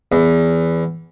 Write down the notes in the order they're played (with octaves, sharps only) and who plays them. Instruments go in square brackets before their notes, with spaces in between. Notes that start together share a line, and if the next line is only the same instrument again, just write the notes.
[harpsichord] E2